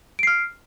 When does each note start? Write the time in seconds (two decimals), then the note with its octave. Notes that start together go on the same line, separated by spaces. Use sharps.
0.19 D7
0.23 C7
0.27 F6